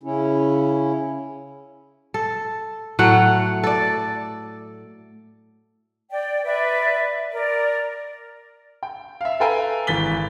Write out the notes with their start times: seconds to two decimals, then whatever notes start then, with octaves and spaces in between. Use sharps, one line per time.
0.03 C#3 C#4 E4
2.14 A4
2.99 A2 F#3 A3 F#5
3.63 A4 D5
6.11 D5 G5
6.45 B4 D5 E5
7.32 A#4 D5
8.83 G5
9.21 E5 F5
9.40 A4 B4 F5 G5 G#5 A#5
9.87 G#1 E3 A6 B6 G7